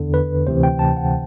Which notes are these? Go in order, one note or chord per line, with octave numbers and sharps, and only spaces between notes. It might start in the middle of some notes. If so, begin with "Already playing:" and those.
Already playing: E2 D3
B4
D2 C3 E3 C5
G5
A5
F#5